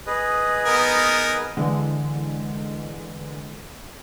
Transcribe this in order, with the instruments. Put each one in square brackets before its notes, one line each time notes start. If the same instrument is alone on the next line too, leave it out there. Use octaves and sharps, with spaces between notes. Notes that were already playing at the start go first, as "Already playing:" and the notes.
[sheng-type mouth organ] G#4 B4 D#5
[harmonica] B3 D#4 A#4
[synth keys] D3 E3 G#3